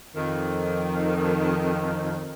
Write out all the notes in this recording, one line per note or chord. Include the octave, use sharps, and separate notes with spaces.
F2 D#3